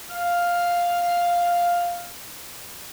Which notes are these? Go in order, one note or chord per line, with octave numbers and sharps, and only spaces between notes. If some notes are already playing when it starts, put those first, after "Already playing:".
F5 F6